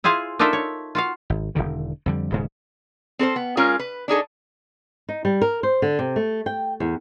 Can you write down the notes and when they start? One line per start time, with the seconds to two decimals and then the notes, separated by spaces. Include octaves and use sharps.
0.04 E4 F4 G#4 C5 F5
0.39 D4 D#4 F4 A4 A#4 E5
0.53 C#5
0.95 F4 F#4 F5
1.30 G#1
1.55 E1 C2 D3 D#3
2.06 F2 D3 G3
2.32 D#1 G#2 C#3
3.19 C4 A4 B4 C5
3.36 B3
3.57 G#3 C#4 F4 A#4
3.79 B4
4.08 D4 D#4 G#4 A4
5.09 D#4
5.25 G3
5.41 A#4
5.63 C5
5.82 D3
5.99 C3
6.16 A3
6.46 G5
6.80 E2